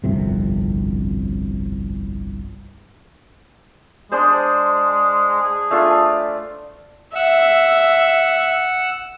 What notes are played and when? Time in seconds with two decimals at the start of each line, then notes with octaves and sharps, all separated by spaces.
0.04 G1 C2 F2 C3
4.12 G#3 D4 G#4 C5
5.42 G#4
5.71 A3 D4 F4
7.15 E5 F#5 E6